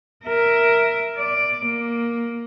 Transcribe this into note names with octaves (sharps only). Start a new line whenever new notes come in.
A#4 E5
D5
A#3